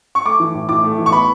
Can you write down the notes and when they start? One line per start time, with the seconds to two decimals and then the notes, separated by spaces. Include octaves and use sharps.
0.15 C#6
0.25 A3 D6
0.40 E3
0.54 A2
0.69 A2 D6
0.84 A3
0.98 E3
1.06 C#6
1.12 B3 B5